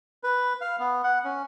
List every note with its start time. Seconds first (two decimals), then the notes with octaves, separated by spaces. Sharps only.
0.24 B4
0.61 F5
0.79 B3
1.04 F#5
1.25 C#4